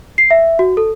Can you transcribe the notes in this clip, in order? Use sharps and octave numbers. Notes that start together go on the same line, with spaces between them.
C7
E5
F#4
A4